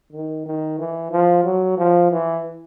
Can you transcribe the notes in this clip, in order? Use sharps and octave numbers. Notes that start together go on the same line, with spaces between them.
D#3
D#3
E3
F3
F#3
F3
E3